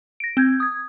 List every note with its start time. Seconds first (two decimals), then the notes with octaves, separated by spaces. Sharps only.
0.20 A#6 D7
0.37 C4 G6 G#6
0.60 D#6 G#6